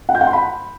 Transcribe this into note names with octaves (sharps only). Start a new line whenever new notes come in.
F#5
G6
F#5
C6
B5